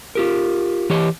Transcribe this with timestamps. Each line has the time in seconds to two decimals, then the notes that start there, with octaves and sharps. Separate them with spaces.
0.15 F4 G4 A#4
0.90 E3 G4 C#5 D#5